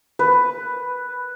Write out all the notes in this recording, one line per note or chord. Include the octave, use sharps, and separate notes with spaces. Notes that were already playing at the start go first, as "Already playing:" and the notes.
B4